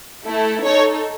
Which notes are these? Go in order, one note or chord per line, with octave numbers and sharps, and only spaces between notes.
A3 E4 A4
D#4 A4 C#5